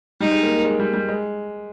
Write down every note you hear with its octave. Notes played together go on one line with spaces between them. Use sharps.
G3 D#4
G#3
A#3
A#3
G#3
G3
G3
G#3